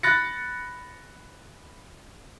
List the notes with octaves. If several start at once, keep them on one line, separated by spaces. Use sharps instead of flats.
B5 F#6 A6 A#6 C#7